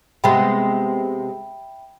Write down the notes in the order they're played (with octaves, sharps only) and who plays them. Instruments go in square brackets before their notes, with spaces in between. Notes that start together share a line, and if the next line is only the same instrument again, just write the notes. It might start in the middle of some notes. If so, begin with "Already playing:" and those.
[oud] C3 G#3 B3 [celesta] E5 G5 B5